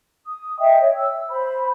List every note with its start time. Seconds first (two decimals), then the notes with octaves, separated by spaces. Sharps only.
0.25 D#6
0.59 D#5 E5 G5
0.79 C#5
0.96 E6
1.30 C5 B5